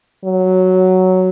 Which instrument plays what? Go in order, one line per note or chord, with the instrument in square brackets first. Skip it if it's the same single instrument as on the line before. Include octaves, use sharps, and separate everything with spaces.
[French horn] F#3